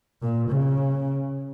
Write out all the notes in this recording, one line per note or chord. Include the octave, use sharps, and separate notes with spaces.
A#2
C#3